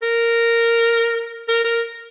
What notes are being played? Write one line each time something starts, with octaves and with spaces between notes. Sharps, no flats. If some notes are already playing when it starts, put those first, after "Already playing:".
A#4
A#4
A#4